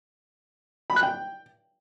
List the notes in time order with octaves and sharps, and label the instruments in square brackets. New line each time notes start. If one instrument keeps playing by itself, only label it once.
[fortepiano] B5
F#6
G5